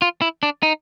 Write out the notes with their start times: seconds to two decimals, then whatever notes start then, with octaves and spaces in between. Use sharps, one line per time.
0.02 F4
0.22 E4
0.43 D4
0.63 D#4